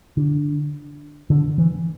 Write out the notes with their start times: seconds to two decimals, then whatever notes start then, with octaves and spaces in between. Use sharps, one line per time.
0.17 D3
1.30 D3
1.58 E3